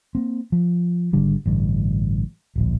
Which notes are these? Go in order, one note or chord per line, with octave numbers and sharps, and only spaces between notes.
A#3 C4
F3
G#1 D3 G3
A1 G2 D3
D1 A#1